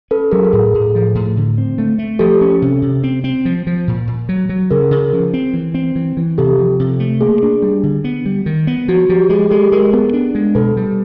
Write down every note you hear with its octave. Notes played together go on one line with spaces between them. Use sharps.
C#4 A4 B4
F#3 G#4 A#4
A4
A2 G#4
A2
F3
A2
D3
C4
A3
A3
F3 G4 A4
C#4
C3
C3
C4
C4
F3
F3
A#2
A#2
F#3
F#3
C#3 G#4 A#4
C#3
F3
C4
E3
C4
E3
E3
C3 G4 A4
F3
C3
A3
A#3 G#4
D4
G3
D3
B3
G3
D#3
B3
F3 F#4
F3 G4
G#3 G#4
G#3 G4 A4
G#3 G#4 A#4
B3
D4
G#3
B2 A4 B4
G3